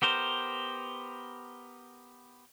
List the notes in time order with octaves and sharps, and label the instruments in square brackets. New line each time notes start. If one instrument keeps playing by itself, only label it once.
[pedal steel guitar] B3 G4 A#4 C5